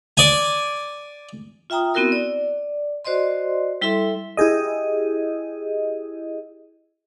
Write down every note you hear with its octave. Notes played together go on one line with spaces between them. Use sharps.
D5 G#5
F4 E5 G5 A#5 D#6
B3 C4 E4 F#4 A#4 E6
D5
F#4 C5 D5 D#5 C6
G3 E4 A4 E5 C6
E4 G4 G#4 D#5